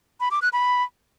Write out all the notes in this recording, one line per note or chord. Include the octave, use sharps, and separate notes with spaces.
B5
D6
F#6
B5